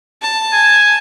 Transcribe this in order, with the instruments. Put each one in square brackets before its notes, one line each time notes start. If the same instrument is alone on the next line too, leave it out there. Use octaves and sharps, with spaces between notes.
[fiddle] A5
[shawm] G#5